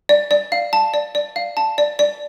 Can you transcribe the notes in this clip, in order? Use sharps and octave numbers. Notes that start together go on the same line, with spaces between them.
D5
D5
F5
A5
D5
D5
F5
A5
D5
D5